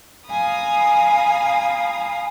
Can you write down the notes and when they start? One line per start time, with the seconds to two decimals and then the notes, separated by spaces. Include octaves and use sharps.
0.26 F5 G#5 A#5 B5 D#6